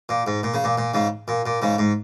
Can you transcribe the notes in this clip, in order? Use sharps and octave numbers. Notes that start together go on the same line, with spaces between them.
A#2
G#2
A#2
C#3
A#2
A#2
G#2 C#3
A#2
A#2
G#2 C#3
G#2